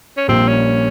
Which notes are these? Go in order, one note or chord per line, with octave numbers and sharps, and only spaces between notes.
C#4
A#1 A#2 G3 A#3 C4
C#4